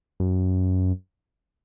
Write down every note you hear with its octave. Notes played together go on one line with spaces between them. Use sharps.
F#2